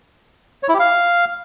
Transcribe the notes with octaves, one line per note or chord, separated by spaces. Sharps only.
C#5
E4
G4
F5